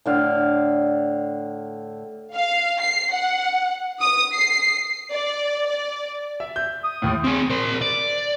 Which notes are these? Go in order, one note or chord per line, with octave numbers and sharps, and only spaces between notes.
A2 D3 F5
F5
C7
F#5
D#6
C7
D5
D5
E5
G6
D#6
D#2 A2
C4 G#4
A#4 C5
D5